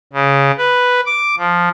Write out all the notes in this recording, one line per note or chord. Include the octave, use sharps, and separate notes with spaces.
C#3
B4
D6
F3